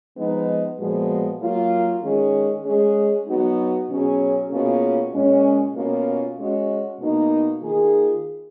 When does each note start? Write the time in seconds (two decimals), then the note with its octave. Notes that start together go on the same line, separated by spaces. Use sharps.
0.17 F3 G#3 B3 D#4
0.78 A#2 F3 G#3 B3 F#4
1.41 F#3 A#3 F4
2.03 D#3 G#3 C#4 G#4
2.65 G#3 C#4 G#4
3.28 F#3 B3 D#4 F#4
3.89 B2 F#3 C#4 G#4
4.51 B2 A#3 C#4 F4 G#4
5.14 A#2 G#3 C#4
5.75 B2 A#3 C#4 F4
6.38 G#3 C#4 F#4
7.00 B2 A#3 D#4
7.62 D#3 A#3 F4 G#4